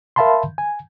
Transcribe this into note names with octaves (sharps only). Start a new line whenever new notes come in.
A#4 E5 F5 A5 B5 C6
G#5